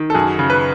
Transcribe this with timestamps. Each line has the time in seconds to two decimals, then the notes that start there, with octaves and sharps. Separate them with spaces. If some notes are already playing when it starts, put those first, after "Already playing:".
Already playing: D#3
0.10 A4
0.14 F#2 G#4
0.39 C#3
0.50 B4